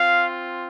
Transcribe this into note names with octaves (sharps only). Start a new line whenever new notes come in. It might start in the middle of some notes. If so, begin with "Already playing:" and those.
Already playing: C4 F4 F5